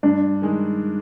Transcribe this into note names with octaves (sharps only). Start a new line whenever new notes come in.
G2 D4
D#3 G#3